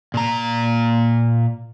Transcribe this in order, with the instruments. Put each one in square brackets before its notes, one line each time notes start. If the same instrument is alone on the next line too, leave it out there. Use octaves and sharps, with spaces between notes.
[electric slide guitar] A#2 A#5